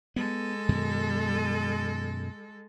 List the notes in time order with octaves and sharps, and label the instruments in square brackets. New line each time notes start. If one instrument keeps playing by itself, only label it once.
[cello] G#3 A4 [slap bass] B3
[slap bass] F#2 B2 D#3